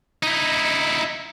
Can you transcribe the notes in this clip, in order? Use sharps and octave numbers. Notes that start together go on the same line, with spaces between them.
D#4 E4